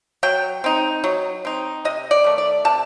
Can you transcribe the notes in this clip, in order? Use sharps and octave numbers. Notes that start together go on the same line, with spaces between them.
F#3 G5
C4 D#4
F#3
C4 D#4
C3 D#5
D5
D#3 A3
D5
C3 A5